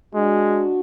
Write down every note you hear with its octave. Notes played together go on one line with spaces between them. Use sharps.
G#3 D4 F#4